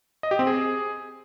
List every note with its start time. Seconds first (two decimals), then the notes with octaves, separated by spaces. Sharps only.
0.23 D#5
0.31 G4
0.39 C4
0.47 G#4